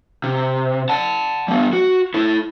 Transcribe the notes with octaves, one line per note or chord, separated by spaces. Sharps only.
C3
F#5 A5
G3 B3
F#4
E4 A4